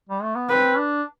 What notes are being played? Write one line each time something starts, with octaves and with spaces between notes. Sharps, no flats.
G3
A3
B3
C4 B4
D4